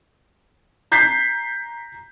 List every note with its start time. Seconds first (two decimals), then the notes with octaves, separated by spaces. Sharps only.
0.92 A#5 G6 B6 C7